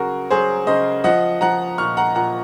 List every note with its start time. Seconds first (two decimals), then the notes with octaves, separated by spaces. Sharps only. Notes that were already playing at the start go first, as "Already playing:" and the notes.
Already playing: C#3 F#3 F#4 G#4 A#4
0.31 F#3 G#4 C5
0.67 C#3 C5 D#5
1.04 F3 D#5 F#5
1.41 F3 F#5 A#5
1.78 A#2 C#6 F6
1.97 F#5 A#5
2.15 A#2 F#5 A#5